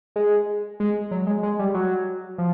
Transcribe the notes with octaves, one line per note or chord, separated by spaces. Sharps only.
G#3
G#3
F#3
G#3
G#3
G3
F#3
F3